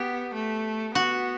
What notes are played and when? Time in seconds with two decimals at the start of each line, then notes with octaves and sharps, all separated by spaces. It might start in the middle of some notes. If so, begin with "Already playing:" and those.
Already playing: B3 G4
0.34 A3
0.95 B3 F#4